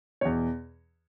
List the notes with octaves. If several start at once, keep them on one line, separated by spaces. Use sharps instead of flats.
E2 B2 C#5